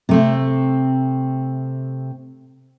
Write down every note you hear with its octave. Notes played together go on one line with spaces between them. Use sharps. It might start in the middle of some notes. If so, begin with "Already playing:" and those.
C3 A3 C4